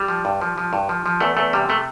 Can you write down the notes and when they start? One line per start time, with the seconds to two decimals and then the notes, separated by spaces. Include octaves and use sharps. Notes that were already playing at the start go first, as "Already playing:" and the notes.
Already playing: G3
0.08 F3
0.25 G2
0.41 F3
0.58 F3
0.73 G2
0.89 F3
1.06 F3
1.20 E2 A3
1.37 E2 A3
1.53 C3 G3
1.69 C3 A3